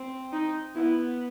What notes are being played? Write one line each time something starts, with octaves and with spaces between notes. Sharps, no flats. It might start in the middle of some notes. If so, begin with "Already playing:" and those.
Already playing: C4
D#4
B3 E4